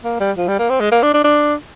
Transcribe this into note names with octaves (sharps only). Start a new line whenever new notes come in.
A#3
G3
F3
G3
A#3
C4
G#3
A#3
D4
D4
D4